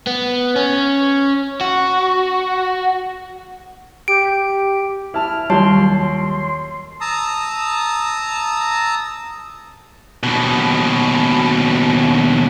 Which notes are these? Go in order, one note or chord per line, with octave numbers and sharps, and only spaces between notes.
B3
C#4
F#4
G4 D7
E4 A5 F6
D#2 F#3 G3 F4 C#5 A5 C6
A5 A#5 D#6 E6
D#2 B2